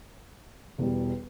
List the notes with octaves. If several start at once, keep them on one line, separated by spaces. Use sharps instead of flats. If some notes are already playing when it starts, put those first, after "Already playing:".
E1 E2 B2 G3